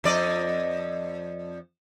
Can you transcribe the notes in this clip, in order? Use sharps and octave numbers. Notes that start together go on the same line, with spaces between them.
F2 D5 D#5